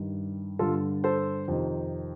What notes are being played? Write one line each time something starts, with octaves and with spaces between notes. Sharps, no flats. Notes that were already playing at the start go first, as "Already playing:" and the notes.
Already playing: G2 D#3
G2 D3 F4 A4
A4 C5
F2 C3 D#3